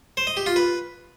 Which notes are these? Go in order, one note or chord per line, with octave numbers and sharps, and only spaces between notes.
C5
D#5
G4
F4
B4